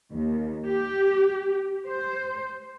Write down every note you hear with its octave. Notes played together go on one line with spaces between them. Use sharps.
D#2
G4
C5